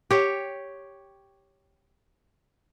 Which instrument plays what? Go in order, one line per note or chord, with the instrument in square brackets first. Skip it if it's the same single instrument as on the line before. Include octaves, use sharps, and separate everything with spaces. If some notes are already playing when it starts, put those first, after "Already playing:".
[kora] G4 C#5